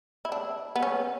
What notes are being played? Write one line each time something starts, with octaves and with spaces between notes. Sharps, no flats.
E4
D4
B3
C#4